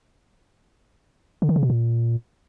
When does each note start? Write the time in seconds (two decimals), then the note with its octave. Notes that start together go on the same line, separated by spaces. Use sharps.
1.42 D3
1.49 D#3
1.56 C#3
1.63 B2
1.70 A#2